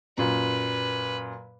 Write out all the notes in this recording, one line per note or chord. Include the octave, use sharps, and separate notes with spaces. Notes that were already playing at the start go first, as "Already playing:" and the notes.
F#2 A#2 B4